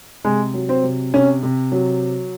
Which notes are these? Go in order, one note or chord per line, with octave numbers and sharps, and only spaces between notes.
C3 G#3
F#3
C4
C3
C3 C#4
C3
F#3